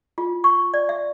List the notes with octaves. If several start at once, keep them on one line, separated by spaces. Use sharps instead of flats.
F4
C#6
D5
E5